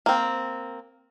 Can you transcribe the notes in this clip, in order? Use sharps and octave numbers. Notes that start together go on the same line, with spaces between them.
A#3 C4